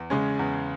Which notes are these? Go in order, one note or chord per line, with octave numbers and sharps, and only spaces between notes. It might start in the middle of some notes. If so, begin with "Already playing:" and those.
Already playing: E2
C#3 G#3 C#4
E2